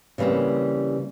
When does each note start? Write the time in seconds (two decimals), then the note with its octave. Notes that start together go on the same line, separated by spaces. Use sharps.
0.18 C#3 E3 G3 A#3 C4